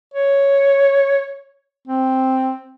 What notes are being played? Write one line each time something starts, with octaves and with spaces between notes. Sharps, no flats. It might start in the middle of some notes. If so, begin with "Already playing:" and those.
C#5
C4